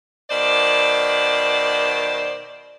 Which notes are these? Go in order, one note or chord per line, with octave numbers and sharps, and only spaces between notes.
B2 D#3 C5 D5